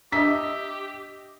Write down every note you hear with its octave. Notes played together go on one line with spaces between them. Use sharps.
D4 G4 D#5 E5 B6